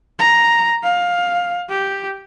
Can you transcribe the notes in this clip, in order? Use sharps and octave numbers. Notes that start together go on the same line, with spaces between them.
A#5
F5
G4